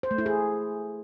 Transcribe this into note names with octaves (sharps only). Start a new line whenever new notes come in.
C5
A3
E4
G#4